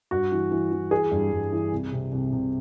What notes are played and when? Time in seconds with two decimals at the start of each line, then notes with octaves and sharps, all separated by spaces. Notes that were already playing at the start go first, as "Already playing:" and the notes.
0.11 G2 F#4
0.32 E3
0.51 E3
0.71 E3
0.91 E3 G#4
1.11 G2
1.32 G2
1.52 E3
1.72 C2
1.92 C3
2.12 C2
2.33 C3